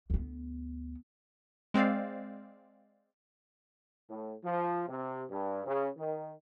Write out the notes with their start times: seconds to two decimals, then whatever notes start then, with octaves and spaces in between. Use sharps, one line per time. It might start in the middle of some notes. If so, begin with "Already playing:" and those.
0.10 D2 B3
1.74 G#3 C4 C5 D5 F5
4.10 A2
4.44 F3
4.88 C3
5.30 G2
5.66 C#3
5.97 D#3